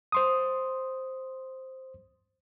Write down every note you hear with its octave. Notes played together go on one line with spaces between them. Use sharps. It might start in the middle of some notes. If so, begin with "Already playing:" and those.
C5 C6 D#6